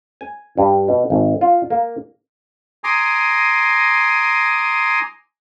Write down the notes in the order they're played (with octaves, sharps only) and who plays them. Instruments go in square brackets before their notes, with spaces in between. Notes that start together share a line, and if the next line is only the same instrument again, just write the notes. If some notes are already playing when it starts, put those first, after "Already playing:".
[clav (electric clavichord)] G#5
G2
B2
G#1
F4
A#3
[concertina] G#5 A#5 C6 D6 D#6